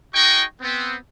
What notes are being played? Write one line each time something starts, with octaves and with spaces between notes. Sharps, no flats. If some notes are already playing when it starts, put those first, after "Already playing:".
D#4 F#4 G#4 D#5 G5 C#6
B3 C4